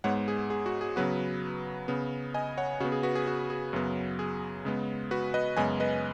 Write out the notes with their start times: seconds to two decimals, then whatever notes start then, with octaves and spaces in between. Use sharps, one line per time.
0.04 G#2 G#3 B3 C#5 F#5
0.28 G#4
0.50 G#4
0.66 F#4
0.81 G#4
0.96 C#3 F#3 B3 F#4 B4
1.88 C#3 B3
2.34 D#5 G#5
2.58 C#5 F#5
2.80 C#3 B3 F#4
2.92 G#4
3.03 F#4 B4
3.15 G#4
3.27 F#4
3.50 G#4
3.73 F#2 C#3 F#3 B3
4.19 G#4
4.65 C#3 G#3 B3
5.11 F#4 B4
5.34 B4 D#5
5.56 F#2 C#3 G#3 B3 D#5 G#5
5.80 B4 D#5